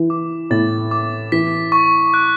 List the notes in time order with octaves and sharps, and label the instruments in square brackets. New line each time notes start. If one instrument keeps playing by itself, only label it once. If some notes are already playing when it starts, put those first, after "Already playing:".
Already playing: [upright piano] E3
[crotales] D6
[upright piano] A2 [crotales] A6
[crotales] D6
[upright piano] E3 [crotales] B6
[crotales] C#6
F#6